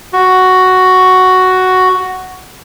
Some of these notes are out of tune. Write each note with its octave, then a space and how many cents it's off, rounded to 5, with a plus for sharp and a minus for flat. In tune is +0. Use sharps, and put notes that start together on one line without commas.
F#4 +5